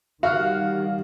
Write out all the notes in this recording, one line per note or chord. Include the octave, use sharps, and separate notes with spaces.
D#3 G3 F#4 F5 F#5 F6